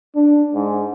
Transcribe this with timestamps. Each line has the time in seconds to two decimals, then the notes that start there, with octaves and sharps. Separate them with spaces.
0.15 D4
0.54 G#2